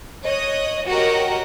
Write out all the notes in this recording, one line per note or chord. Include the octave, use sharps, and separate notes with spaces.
C#5 D#5 D#6 F#6
F#4 G4 A#4 C#5 D#5 F#5